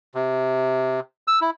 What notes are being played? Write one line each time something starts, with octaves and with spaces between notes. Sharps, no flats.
C3
E6
E4